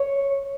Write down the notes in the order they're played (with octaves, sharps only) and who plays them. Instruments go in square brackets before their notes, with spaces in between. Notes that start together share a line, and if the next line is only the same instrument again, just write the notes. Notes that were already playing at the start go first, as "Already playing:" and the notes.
Already playing: [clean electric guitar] C#5